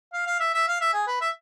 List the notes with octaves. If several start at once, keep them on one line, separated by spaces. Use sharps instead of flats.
F5
F5
E5
E5
F5
E5
G#4
B4
E5